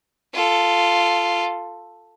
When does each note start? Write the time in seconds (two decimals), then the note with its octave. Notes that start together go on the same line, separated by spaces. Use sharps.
0.34 F4 A4